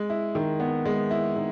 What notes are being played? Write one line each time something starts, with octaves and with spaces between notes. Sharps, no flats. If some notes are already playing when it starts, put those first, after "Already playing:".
Already playing: G#3
E4
D#3
B3
G#3
E4
D#3